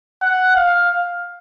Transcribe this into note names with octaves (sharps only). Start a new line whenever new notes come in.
F#5
F5